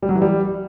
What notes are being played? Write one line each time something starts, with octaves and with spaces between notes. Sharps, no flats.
G3
F#3
E3
G3